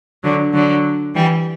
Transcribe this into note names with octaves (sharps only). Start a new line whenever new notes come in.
D3 F#3
D3 F#3
E3 G3